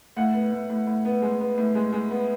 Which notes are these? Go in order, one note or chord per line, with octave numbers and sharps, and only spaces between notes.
A2 F#5
B3
A2
A2
A2
B3
G#3
B3
A2
G#3
G#3
B3